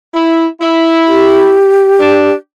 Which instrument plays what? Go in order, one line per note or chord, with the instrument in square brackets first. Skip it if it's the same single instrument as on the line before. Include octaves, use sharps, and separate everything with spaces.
[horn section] E4
E4
[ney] G4
[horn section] D4